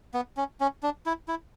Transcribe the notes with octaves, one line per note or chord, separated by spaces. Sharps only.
B3
C#4
C#4
D4
E4
E4